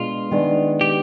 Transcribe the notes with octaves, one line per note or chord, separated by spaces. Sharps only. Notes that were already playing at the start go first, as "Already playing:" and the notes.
Already playing: B2 G#3 D4 F4
D#3 G#3 B3 D4
G4